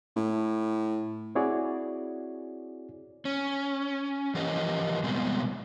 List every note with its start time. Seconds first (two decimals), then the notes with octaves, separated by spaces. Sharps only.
0.16 A2
1.35 C4 E4 F#4 G#4 C#5 D5
3.25 C#4
4.35 E3 F3 G4 A#4 C#5 D#5
5.03 B2 G3 G#3 B3 C4